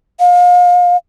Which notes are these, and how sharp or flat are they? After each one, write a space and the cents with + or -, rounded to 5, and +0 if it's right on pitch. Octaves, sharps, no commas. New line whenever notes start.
F5 +35